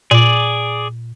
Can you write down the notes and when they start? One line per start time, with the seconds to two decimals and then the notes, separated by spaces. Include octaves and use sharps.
0.11 A#2 G#4 D5